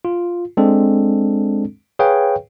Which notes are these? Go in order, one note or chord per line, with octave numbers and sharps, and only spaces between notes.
F4
G#3 C4 D4 A4
G#4 B4 C#5 F5 G5